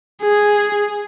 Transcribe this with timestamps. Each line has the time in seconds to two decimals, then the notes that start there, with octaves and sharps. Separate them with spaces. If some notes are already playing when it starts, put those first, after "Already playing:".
0.22 G#4